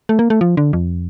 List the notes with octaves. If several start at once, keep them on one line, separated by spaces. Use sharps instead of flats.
A3
A#3
A3
F3
D3
F2